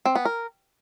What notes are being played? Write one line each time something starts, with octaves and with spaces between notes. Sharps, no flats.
C4
B3
A#4